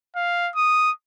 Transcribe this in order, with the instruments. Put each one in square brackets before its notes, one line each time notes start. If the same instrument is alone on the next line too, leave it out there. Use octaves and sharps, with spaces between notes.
[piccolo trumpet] F5
D#6